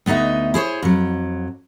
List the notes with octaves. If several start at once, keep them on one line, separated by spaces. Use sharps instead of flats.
D2 B3 D#4 D#5 E5
E4 G#4 C5 C#5
F2 F#3